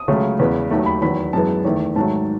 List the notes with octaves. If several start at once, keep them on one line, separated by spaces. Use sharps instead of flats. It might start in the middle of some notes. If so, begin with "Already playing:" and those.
Already playing: D#6
C#2 C#3 F#3 A3
E2 C#3 G#3 B3
D#2 D#3 F#3 A3
B5
E2 D#3 F#3 B5
F#2 E3 G#3 B3 A5
E2 D#3 A3
G#2 D#3 F#3 A3 A5